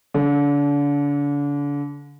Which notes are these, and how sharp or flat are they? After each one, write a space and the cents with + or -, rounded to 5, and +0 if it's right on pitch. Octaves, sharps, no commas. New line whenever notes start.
D3 -35